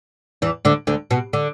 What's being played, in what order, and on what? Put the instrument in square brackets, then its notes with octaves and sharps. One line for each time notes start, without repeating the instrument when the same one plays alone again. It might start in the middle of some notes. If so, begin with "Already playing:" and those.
[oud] E2 E3
D2 D3
D2 D3
B2
D3